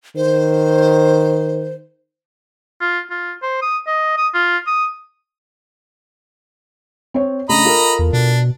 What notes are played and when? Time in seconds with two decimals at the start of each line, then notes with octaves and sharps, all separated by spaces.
0.16 D#3 C5
2.81 F4
3.10 F4
3.42 C5
3.62 D#6
3.87 D#5
4.18 D#6
4.34 F4
4.67 D#6
7.14 C4 C#5
7.49 C#3 A3 D4 D#5 A#5 B5
7.65 F4 A4 A#4
7.99 E2
8.13 B2 D4